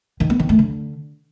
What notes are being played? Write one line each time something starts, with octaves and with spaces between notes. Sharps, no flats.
D#3
B3
D#3
A3
D3